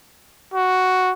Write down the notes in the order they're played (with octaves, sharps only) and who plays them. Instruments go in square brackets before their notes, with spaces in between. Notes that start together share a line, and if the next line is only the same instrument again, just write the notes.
[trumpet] F#4